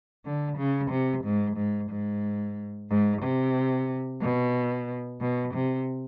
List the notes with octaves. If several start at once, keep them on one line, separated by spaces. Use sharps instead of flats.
D3
C#3
C3
G#2
G#2
G#2
G#2
C3
B2
B2
C3